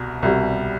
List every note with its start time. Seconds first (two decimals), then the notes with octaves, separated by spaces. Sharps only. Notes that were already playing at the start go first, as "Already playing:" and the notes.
Already playing: C2 B2
0.23 C2 B2 G3